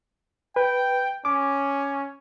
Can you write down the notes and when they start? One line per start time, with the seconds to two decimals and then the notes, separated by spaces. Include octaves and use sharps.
0.56 B4 G5
1.25 C#4 D6